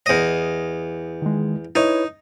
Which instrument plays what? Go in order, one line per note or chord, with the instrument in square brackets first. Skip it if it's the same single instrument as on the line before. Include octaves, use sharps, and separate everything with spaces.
[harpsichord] E2 D#5
[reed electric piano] D#3 G#3
[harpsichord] D#4 [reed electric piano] E4 B4 C#5